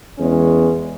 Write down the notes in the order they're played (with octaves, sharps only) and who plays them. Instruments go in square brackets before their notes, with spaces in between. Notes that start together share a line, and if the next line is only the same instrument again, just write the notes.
[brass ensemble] E2 G#3 C#4